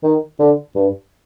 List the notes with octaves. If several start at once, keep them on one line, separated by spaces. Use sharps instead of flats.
D#3
D3
G2